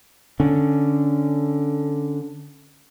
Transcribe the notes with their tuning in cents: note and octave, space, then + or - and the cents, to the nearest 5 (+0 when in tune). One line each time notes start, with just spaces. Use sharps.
D3 +0 C#4 +0